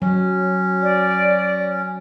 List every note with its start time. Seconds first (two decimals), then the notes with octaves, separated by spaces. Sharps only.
0.02 F#3 C#4
0.82 D5